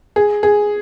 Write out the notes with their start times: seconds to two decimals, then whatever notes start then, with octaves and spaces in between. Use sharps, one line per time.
0.16 G#4
0.43 G#4